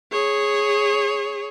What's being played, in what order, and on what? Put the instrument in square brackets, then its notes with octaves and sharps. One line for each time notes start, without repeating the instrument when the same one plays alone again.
[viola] G#4 C#5